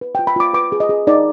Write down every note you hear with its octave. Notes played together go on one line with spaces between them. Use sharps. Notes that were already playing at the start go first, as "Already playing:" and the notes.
B4
F4 G5
B5
F4 D6
B4 D6
G#4
D#5
G#4
D#4 D5